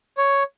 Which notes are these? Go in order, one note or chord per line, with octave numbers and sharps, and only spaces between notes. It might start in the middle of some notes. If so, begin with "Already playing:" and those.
C#5